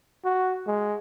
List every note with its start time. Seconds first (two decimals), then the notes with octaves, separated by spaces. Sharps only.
0.25 F#4
0.67 G#3